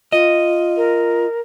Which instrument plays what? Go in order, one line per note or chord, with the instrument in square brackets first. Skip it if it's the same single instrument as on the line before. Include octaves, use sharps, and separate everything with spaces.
[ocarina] F4 [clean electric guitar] D#5
[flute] A#4